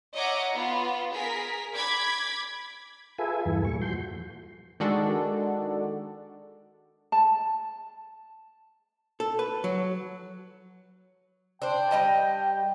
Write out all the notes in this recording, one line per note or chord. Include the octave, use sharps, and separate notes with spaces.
C#5 D#5 E5 F#5 A#5 D6
B3 F4
G#4 A#4 B6
B5 D6 G#6 B6
F4 G#4 A4 B4 E5 G#5
E2 G2 E3 A4
A#2 G3 C#6
F3 F#4 C6 G6
D#3 G#3 D4 F#4 A4 D5
A5
A4
B4
F#3
D4 C5 G5
G3 D#5 A5